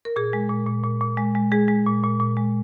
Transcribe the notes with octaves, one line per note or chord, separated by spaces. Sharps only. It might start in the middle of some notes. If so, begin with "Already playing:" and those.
A#4
A#2 G#4
G#3
A#2
A#2
A#2
A#2
G#3
G#3
G#3 G#4
G#3
A#2
A#2
A#2
G#3